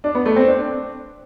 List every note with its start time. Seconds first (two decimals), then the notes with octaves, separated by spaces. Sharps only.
0.04 D4
0.15 B3
0.26 A3
0.36 C4
0.47 D4